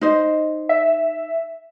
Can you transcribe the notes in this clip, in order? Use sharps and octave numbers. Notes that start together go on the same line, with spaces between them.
D#4 C5 D#5
E5